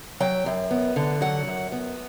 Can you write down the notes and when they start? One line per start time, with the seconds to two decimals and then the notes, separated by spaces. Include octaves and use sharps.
0.20 F#3 G5
0.46 F#2
0.71 B3
0.96 D3
1.21 F#3 F#5
1.47 F#2
1.72 B3